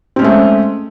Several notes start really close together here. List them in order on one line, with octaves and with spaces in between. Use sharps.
C4 C#4 G#3 A3